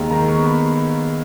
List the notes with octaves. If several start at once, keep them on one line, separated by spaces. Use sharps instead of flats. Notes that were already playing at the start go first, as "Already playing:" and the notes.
Already playing: D#2 G#3 A#5
D#3 A#5
C#6
B3
B5